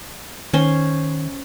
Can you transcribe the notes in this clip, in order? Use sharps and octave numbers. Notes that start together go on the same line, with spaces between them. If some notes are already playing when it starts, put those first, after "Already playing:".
D#3 C#4 C5